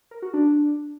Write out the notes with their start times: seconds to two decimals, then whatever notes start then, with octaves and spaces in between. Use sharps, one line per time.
0.11 A#4
0.22 F#4
0.34 D4